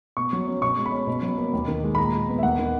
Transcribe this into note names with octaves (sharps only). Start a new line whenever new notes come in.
B2 C#6
F#3
C#4
B2 C#6
G#3
B5
C#4
B2
F#3
A#3
D#2
D#3
G#3
B5
A#2 A#5
G#3
B3
E5
D#2 F#5
D#3